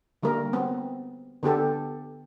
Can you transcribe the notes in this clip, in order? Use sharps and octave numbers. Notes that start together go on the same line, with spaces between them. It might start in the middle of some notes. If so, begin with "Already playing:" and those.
D3 G3 A#3 A#4
B3 C4
D3 B3 G4 A4